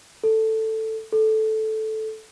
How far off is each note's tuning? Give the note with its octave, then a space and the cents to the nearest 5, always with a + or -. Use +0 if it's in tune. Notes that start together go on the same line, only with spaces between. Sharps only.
A4 +5
A4 -10